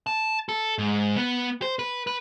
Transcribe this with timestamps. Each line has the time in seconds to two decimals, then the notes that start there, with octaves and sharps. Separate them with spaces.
0.07 A5
0.49 A4
0.78 G#2
1.17 B3
1.62 C5
1.79 B4
2.07 B4